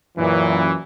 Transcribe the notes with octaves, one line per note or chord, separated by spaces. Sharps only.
F#2 A#2 E3